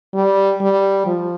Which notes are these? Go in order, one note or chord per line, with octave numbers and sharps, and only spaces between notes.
G3
G3
F3